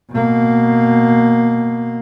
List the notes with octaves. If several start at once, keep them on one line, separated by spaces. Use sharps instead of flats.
B2 A#3